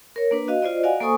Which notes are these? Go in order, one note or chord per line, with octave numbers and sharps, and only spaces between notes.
A#4 C#5
A#3 D4 B4
F#4 D#5 F5
F4 C5 D5 D#5
F#4 D5 D#5 F5 F#5 G#5
A#3 A4 C5 G#5 C#6 D#6